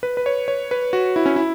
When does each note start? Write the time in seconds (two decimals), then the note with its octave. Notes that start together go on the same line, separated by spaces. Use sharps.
0.03 B4
0.17 B4
0.26 C#5
0.48 C#5
0.71 B4
0.93 F#4
1.16 E4
1.26 C#4
1.36 E4